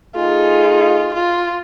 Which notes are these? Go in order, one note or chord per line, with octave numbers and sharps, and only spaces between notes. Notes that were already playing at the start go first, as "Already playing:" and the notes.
A3 D#4 F4 G#4
F4